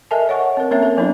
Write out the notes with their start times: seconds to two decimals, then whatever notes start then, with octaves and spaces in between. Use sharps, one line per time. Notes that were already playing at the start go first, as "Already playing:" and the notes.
0.11 A4 A#4 D#5 E5 G#5 A5
0.29 C#5 D#5 F#5 C#6
0.57 C4 A#4
0.71 A#3 C4 C#4 A#4 C#5 E5
0.83 A4 A#4
0.97 F#3 B3 D4 E4